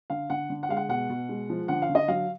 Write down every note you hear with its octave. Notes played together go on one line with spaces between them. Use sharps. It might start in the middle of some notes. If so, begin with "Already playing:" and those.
D3 F5
D3 F#5
D3
F#5
G#3 F5
F#5
B2 F#5
B2
G#3
F3
D3 F#5
F5
D3
D#5
F#3 F5